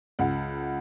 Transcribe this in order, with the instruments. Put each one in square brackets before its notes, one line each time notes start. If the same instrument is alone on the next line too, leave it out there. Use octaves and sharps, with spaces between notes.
[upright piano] C#2 F#5